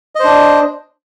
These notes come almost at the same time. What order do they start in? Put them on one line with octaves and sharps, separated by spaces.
D#5 C5 D4